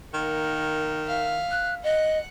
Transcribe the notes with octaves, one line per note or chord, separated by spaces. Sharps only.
D#3 A#3 F#5
E5 F5
F#6
D#5 F#5 F#6